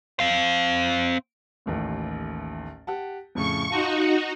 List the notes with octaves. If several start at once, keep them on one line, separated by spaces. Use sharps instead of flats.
C4 F5
A1 D#2 A2
G4 F#5 A5
F2 A2 C#3 C#6
D#4 F4 F#4 A5 C6